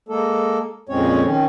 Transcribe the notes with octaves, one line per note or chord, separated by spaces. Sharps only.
G#3 A#3 A4
F2 A#2 G#3 C4 C#4 C#5
D#3 C#4